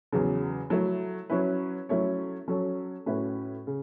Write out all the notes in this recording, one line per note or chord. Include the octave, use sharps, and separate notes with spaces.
E2 C#3 F#3
F#3 A3 E4
F#3 C#4 E4 B4
F#3 A3 C#4 E4 C#5
F#3 C#4 A4 C#5
A2 A3 C#4 F#4 B4
C#3